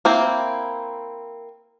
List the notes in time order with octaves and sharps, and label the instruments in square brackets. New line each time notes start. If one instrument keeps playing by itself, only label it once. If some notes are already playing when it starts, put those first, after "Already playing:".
[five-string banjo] A#3 C4 E4